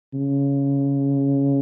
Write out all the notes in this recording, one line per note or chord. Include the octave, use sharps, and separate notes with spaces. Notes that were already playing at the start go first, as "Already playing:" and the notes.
C#3